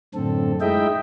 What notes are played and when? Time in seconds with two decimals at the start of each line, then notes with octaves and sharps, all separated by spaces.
0.15 F#2 A2 D3 C4 A4
0.61 G#3 D#4 E4 D#5 E5 G5